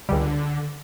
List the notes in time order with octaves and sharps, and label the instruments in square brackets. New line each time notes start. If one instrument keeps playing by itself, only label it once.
[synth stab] C#2 G3 [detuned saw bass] D3